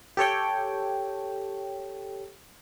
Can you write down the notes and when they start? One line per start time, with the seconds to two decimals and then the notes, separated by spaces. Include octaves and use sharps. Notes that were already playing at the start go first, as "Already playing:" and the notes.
0.17 G4 A4 C#5 G5